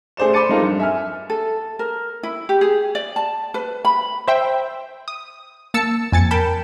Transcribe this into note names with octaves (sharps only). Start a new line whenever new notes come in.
A3 G#4 C5 D5 E7
B5 C6 D6 A6 C#7 D#7
G#3 C4 D#4 F4 A4 A#4
G2
E5 G#5 F6
A4
A#4
E4
G4
G#4
D5
A5
B4
B5
C5 E5 G5
D#6
A#3 A5 E6 C#7
F2 G#5 A6 C#7
A#4 G5 A5 B5